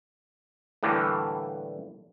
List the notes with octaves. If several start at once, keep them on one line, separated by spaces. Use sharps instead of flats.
A2 D3 E3 G3 A#3